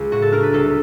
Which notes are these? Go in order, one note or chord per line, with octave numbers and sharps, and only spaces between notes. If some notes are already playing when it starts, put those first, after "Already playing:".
Already playing: C#2 B3
A2 F#4
A4
D4 A#4
B4
C2 A4